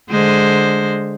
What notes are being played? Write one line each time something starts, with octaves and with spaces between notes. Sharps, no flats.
D3 G#3 C5